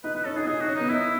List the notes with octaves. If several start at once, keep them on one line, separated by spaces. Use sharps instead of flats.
D#4 B4
D#4 B4
C#4 A4
D#4 G#4
D#4 G#4
F#4
C#4
B3 D#4
D#4 E4